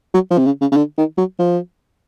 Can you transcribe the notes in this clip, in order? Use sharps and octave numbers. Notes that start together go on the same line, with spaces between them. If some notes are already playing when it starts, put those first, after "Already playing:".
F#3
F3
C3
C#3
C#3
C#3
D3
D#3
F#3
F3